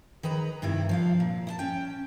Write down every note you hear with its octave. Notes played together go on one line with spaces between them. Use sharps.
D#3 G#4 B4 A#5
G2 C3 D#3 E4
F3 D4 F5
A#2
E4 A5
C#4 G5